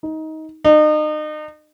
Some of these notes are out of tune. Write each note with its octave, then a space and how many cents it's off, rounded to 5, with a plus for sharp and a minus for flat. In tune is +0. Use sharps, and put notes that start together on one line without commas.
D#4 +20
D#4 -35